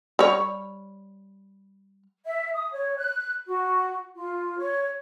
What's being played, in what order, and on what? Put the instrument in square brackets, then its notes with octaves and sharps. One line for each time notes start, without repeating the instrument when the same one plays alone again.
[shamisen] G3 C#5
[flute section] E5
D#6
C#5
F#6
F#4
F4
C#5